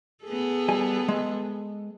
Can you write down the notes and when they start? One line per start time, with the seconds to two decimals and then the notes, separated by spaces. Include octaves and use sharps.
0.24 B3 G#4 A4
0.68 G3 G#5
1.08 G#3